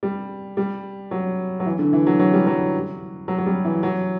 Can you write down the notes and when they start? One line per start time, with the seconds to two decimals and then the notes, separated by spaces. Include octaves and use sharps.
0.03 G3
0.57 G3
1.11 F#3
1.60 F#3
1.66 E3
1.79 D3
1.93 E3
2.07 F#3
2.20 F#3
2.33 G3
2.47 F#3
3.28 F#3
3.38 F#3
3.46 G3
3.65 E3
3.83 F#3